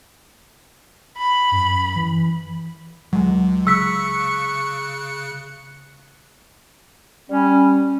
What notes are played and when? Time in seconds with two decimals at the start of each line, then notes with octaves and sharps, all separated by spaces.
1.17 B5
1.52 F#2
1.96 E3
3.13 C#2 F#3 G#3
3.67 C#3 C#6 E6 F#6 B6 C#7
7.30 G3 C#4